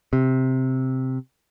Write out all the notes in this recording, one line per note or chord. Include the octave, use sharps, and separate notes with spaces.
C3